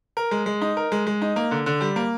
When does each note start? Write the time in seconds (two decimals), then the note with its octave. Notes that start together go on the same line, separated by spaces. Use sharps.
0.17 A#4
0.31 G#3
0.46 G#3
0.62 D#4
0.77 A#4
0.92 G#3
1.07 G#3
1.22 D#4
1.36 A#3
1.51 D3
1.66 D3
1.81 G3
1.96 A#3